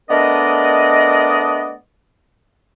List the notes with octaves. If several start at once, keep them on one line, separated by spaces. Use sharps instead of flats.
A3 B3 D4 A#4 D5 D#5